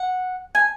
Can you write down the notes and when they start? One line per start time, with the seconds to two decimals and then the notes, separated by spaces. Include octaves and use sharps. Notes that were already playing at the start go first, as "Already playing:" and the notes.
Already playing: F#5
0.55 G#5